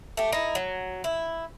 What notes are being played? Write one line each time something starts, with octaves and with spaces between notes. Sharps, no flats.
A3 G4
D#4 E4
F#3
E4